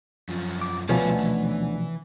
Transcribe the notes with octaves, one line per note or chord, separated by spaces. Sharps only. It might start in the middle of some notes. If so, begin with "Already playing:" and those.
F#2 F3
D6
D2 B2 F3 G3 B3 C#4 A5
E3